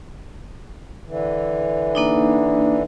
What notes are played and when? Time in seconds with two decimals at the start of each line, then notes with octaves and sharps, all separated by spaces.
1.07 D3 E3
1.95 A#3 D4 D#4